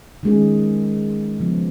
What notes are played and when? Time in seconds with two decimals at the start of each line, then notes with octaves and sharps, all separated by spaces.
0.23 D#3 G#3 C#4 G#4
1.40 C#3 F3 B3